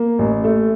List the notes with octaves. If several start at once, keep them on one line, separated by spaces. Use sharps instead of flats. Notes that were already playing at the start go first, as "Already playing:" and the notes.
Already playing: A#3
A1
A3